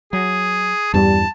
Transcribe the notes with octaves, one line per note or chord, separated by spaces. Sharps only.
F#3 G#4
E2 G2 G3 A5